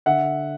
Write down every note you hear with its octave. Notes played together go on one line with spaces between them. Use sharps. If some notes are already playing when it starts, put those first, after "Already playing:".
D3 E5 F#5